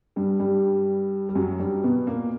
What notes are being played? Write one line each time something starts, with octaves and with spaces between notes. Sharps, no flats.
G2 G3
G2 G3
G3
F#2 F#3
G2 G3
B2 B3
A#2 A#3